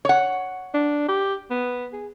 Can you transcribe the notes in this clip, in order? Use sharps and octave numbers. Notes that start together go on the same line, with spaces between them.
C#5 F#5
D4
G4
B3
G#4